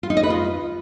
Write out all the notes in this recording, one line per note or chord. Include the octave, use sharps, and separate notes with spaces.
F4
D#4
D#5
B4
F4